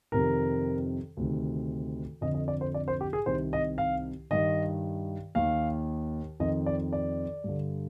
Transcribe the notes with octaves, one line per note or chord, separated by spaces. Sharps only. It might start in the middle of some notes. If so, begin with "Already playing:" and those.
F2 C3 D#3 A#4
D2 C3 D#3
F2 D3 D#5
D#5
D5
C5
D5
C5
G4
G#4
C2 C3 D#3 C5
D#5
F5
G2 D#3 D#5
D#2 D#3 F5
F2 D#3 D#5
D5
D5
G2 D3